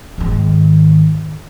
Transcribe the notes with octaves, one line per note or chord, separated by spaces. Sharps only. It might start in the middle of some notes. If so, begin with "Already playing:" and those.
G#2 D#3